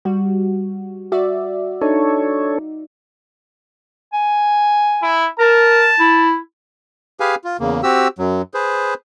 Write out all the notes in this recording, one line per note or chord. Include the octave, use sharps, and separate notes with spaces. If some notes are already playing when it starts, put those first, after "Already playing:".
G3 F#4
F#4 D5 E5
D4 D#4 A4 C#5
G#5
E4
A#4 A5
E4
G4 G#4 B4 F5 G#5
F4
E2 C#3 A#3
C4 F#4 G4 E6
F#2 F#3
G#4 B4 C5